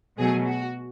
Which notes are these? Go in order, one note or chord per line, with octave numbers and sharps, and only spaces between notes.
B2 F#3 G#3 A3 G#4
F#4